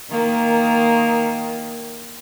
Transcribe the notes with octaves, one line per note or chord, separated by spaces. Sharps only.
D#3 A#3